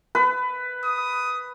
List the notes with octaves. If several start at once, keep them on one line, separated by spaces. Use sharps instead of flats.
B4
D#6